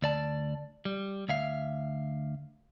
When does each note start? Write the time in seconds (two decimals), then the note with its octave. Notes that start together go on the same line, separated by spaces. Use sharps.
0.02 D2 D5 A5
0.85 G3
1.29 D2 E5 F5